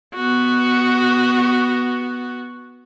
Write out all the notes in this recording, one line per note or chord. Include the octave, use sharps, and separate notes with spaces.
B3 F#4